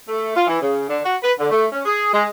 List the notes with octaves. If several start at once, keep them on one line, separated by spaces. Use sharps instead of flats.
A3
F4
E3
C#3
D3
F#4
B4
D3
A3
C#4
G#4
G#3